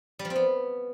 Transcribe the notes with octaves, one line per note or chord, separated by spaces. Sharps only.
G3
F3
C4
B3